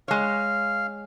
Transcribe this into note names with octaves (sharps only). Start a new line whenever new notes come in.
G#3 C#5 F5